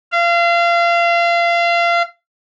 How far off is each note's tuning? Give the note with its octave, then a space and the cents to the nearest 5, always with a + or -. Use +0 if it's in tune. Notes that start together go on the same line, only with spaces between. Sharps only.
F5 -30